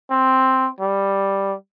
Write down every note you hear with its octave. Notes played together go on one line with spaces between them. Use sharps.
C4
G3